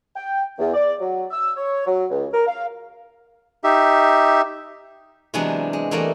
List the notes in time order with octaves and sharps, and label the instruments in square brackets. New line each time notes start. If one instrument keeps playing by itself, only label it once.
[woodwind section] G5
E2
D5
F#3
E6
C#5
F#3
C#2
A#4
F5
[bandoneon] D#4 G4 E5
[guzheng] C3 E3 F#3 G#3 B3 D4
G#3
E3 G3 A3 A#3 D5 D#5